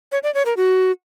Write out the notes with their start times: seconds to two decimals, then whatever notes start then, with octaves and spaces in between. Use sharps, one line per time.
0.12 C#5
0.23 D5
0.34 C#5
0.46 A#4
0.57 F#4